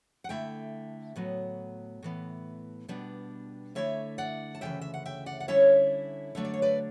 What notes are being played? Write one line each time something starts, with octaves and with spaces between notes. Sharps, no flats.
F#5
D3 A3 E4 E5 G5
A2 F#3 B3
A2 E3 B3
B2 G3 B3 D4
D3 A3 E4 C#5 E5
D5 F#5
A5
D2 C#3 E3 E5 G5
E5
F#5
E5 G5
D5 F#5
F#5
D3 G3 C#4 E4 C#5 E5
D3 F#3 A3 D4 E5
D5
C#5
B4 D5